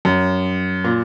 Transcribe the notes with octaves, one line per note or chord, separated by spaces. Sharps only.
F#2
A#2